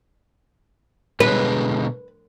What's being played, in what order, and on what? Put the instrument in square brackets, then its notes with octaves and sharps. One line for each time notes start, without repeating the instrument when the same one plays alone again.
[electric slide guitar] B2 D3 G#3 [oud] B4